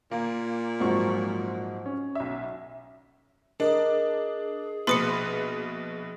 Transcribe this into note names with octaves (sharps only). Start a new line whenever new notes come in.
A#2 A#3
G#2 F3 F#3 C4 C#6
C#4
B1 E5
D4 G#4 A#4 D#5
A#1 B2 B4 C6 D#6 C#7